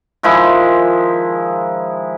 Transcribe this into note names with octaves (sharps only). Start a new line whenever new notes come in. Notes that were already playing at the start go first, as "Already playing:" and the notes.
D#3 F3 G#3 E4